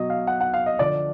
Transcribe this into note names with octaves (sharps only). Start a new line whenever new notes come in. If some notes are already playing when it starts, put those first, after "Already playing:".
Already playing: B2 F#3 D#5
F5
F#5
F#5
F5
D#5
D3 F3 D5